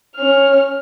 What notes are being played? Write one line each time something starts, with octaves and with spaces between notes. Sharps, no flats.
C#4 F6